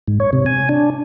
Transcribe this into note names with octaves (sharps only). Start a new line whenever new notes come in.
G#2
C#5
C3
G#5
D4